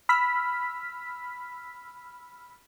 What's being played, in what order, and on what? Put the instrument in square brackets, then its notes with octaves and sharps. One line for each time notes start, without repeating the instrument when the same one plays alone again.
[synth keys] B5 E6 F6 B6